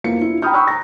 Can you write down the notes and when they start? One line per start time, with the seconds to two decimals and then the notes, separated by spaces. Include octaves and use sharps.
0.04 F2 A#3 B3 E4 C#7
0.19 D4 E4 F4
0.42 G5 A#5 B5 D#6 F6 G6
0.54 G5 B5 C#6 D#6 E6 F#6
0.67 A#5 A#6